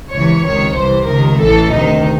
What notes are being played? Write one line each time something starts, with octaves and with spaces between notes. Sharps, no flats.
C#2 C3 E3 C#5
C#2 C3 D#3 C#5
C2 C3 E3 C5
C#2 C3 D#3 A#4
A1 A2 E3 A4
D2 C3 D#3 D#4